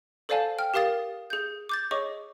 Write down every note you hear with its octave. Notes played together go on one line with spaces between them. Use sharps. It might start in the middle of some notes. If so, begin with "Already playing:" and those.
A4 C5 D5 F5 G#5 A5
G5 F6
G4 A#4 F5 D#6 A6
G#4 G6
D6 G6 A6
G#4 C#5 D#5 C#6 D6